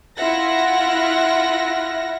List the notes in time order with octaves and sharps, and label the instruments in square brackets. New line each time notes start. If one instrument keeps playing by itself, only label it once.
[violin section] E4 F4 E5 F#5 A#6